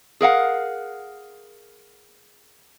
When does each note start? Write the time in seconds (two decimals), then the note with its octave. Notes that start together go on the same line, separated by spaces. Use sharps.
0.21 G#4 A#4 F5 F#5